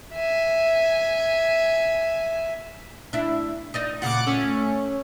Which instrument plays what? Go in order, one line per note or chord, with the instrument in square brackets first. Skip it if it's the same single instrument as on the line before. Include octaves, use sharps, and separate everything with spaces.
[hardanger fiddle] E5 G#5
[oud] D4 E4
D#4 D5 D#5
[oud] A#2 C#3 F4 [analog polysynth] F#5 D6
[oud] A3 [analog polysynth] C#4